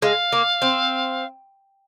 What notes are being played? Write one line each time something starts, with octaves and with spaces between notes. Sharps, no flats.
G#3 F5
A#3
C4